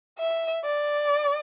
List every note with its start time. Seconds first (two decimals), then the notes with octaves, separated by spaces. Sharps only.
0.19 E5
0.64 D5